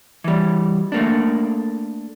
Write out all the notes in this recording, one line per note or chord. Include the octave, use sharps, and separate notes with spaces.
E3 G3
A3 A#3 D4